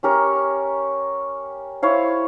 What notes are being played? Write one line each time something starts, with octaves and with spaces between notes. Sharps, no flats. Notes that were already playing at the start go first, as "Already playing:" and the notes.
C#4 G4 A#4 C#5
E4 C5 C#5 F5